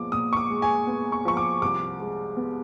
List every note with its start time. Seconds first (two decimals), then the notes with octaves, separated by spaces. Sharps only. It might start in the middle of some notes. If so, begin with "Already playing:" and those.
Already playing: A#2 F3 G#3 B3 D6
0.12 A#2 D#6
0.33 C#6
0.37 D6
0.49 G#3
0.62 G#5
0.87 B3
1.12 C#6
1.25 F3 C#6
1.37 D6
1.62 C2 D6
2.00 G#3
2.37 B3